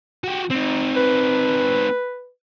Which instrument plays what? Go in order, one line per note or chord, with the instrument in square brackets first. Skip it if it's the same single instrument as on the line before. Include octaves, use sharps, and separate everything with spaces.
[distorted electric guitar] F#4 G4
C4 D#4
[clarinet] B4